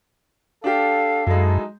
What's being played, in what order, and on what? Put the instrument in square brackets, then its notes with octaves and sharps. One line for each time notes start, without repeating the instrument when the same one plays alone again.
[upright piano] D4 G4 [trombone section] A4 [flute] F5
[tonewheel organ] F#2 [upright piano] F#3 G#3 [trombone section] D#4 E4 A4